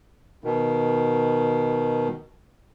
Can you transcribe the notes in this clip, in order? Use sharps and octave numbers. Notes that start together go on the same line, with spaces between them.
B2 D#3